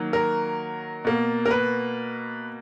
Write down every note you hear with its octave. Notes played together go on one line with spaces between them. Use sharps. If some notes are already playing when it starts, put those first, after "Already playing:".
Already playing: D#3 F#3 A#3
A#4
B2 A#3
A#4
B4